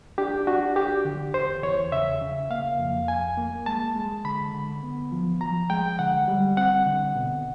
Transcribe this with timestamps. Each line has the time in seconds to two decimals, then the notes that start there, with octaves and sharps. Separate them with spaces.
0.18 D4 G4
0.47 D4 F#4
0.76 D4 G4
1.05 D3
1.34 E2 C5
1.63 E2 C#5
1.92 C#3 E5
2.21 C#3
2.50 A#3 F5
2.79 F2
3.08 F2 G#5
3.38 A#3
3.66 G#3 A5
3.96 G#3
4.24 D3 B5
4.54 D3
4.83 B3
5.12 F3
5.41 F3 A#5
5.70 G#3 G5
5.99 D3 F#5
6.28 G3
6.57 C4 F#5
6.86 D3
7.16 B2